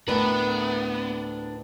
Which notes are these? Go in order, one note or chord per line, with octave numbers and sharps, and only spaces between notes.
D2 A2 B3 D4 A#4 B4